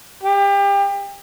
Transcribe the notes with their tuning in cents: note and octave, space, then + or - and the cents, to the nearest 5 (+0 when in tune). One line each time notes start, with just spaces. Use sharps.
G4 +30